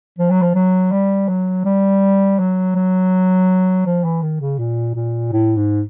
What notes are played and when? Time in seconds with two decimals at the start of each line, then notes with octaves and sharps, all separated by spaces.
0.18 F3
0.30 F#3
0.42 F3
0.55 F#3
0.91 G3
1.28 F#3
1.65 G3
2.39 F#3
2.75 F#3
3.86 F3
4.04 E3
4.22 D#3
4.40 C#3
4.59 A#2
4.95 A#2
5.32 A2
5.56 G#2